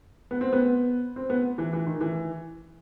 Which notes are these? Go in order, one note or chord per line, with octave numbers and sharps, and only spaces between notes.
B3
C4
B3
C4
B3
E3
E3
D#3
E3